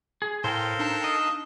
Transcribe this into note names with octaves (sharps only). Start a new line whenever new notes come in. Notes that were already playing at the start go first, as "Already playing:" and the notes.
G#4
A2 A4 A#4 C5 F5 G5
D4 D#4 A5
D#5